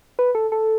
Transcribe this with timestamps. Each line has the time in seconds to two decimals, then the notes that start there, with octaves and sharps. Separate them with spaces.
0.19 B4
0.35 A4
0.52 A4